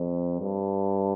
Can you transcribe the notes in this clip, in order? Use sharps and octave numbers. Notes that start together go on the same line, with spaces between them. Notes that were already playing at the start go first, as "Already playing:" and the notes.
Already playing: F2
G2